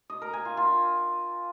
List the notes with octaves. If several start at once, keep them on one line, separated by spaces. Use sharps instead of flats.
D#5
A#4
G#5
F4
F4